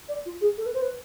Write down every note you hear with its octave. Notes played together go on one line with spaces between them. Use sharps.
D5
F4
G#4
A4
B4
C5
B4